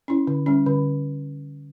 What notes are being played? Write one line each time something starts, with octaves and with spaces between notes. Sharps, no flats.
C#4 E4
D3
G3 C#4
D3